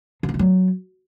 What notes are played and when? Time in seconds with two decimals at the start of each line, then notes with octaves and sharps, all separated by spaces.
0.23 C3
0.29 C#3
0.34 E3
0.39 F#3